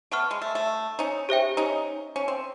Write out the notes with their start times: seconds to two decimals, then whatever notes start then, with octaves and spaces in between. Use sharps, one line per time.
0.12 A3 B3 F#5 A5 C#6 F6
0.31 G#3
0.42 A3
0.55 A3
0.99 C#4 D#4
1.29 G4 C5 E5 G5
1.57 C#4 D#4
2.16 C#4
2.28 C4